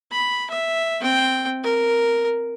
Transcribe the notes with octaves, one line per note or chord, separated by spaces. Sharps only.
B5
E5
C4 G5
A#4